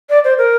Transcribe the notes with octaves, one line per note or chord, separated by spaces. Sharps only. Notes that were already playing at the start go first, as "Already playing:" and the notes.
D5
C5
A#4